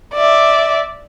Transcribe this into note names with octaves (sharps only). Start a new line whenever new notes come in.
D5 E5